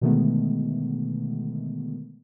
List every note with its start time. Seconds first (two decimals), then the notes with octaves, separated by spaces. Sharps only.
0.01 B2 D3 D#3 G#3 A3 B3